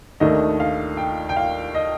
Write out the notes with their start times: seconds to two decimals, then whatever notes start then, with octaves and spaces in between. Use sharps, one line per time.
0.20 D#2 D#3 A3 D4 D#5
0.60 F5
0.97 G5
1.29 G5
1.37 F5
1.75 D#5